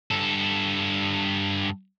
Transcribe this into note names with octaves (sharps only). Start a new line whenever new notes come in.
G2 A4